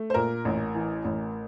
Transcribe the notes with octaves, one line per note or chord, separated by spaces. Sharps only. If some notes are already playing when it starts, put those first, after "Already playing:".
Already playing: A3
C5
A#2 A#4
A1
E3
A1